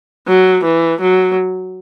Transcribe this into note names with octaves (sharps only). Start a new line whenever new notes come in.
F#3
E3
F#3